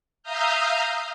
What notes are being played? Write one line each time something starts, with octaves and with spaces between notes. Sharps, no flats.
E5 F5 A#5 D#6 F6 G6